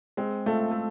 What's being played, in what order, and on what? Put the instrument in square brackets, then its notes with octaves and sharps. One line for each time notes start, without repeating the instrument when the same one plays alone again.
[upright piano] G#3 [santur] C4
[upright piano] A3 [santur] F4 A4
[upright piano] A3